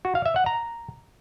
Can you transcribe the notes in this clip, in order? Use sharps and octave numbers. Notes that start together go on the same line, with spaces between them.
F#4
F5
E5
F#5
A#5